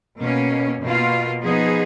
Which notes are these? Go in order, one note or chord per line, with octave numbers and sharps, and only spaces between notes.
B2 A#3 C#4
B2 A#3 F4
F3 B3 D#4 G#4